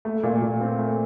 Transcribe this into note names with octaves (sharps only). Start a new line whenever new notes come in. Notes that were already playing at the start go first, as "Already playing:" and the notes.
A3
A#2
A#2
C4
A3